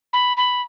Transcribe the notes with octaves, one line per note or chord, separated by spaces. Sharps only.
B5
B5